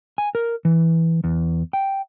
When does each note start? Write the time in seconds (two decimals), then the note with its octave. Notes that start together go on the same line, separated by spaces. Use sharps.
0.18 G#5
0.35 A#4
0.65 E3
1.24 E2
1.73 G5